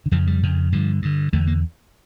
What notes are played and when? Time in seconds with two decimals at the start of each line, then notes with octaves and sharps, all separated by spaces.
0.06 D3
0.11 F2 C#3 E3
0.27 G3
0.43 F2 C#3
0.72 G2 D3 F3
1.02 G2 D3
1.33 E2 D3 A3
1.47 A#3